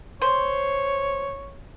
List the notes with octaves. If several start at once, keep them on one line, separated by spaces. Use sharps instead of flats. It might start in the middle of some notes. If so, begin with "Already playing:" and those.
C5 C#5